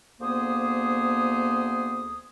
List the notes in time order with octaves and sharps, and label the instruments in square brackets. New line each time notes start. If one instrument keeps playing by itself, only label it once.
[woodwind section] D2 A#3 B3 G#4 C5 D#6